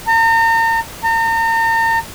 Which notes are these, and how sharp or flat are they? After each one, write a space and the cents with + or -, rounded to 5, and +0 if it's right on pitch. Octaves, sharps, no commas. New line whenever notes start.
A#5 -40
A#5 -40